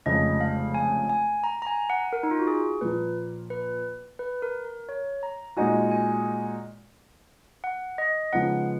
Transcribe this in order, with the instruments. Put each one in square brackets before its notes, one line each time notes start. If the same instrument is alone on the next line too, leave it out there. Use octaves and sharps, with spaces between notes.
[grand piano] F1 F2 C#3 G#3 [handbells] D#5
[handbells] F5
G#5
G#5
A#5
A#5
G#5
F#5
A#4
D#4
F4
F#4
G#4
[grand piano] A#2 F3 A#3 [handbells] B4
[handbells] B4
B4
A#4
A#4
C#5
A#5
[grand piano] A#2 G#3 D#4 F#4 [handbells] G#5
[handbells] G#5
F#5
D#5
[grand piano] C#3 F3 G#3 B3 D#4 [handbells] F#5